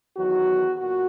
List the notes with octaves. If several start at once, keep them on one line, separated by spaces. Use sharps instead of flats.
E2 D#3 F#3 F#4
A#2 F#4